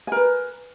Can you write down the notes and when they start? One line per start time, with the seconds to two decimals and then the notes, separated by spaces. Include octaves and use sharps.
0.07 G#5
0.12 A#4
0.16 B4